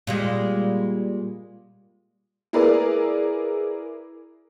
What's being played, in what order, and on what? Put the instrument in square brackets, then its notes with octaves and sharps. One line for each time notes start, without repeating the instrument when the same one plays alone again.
[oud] A#2 G3 G#3
[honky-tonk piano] E4 G#4 A#4 B4 D5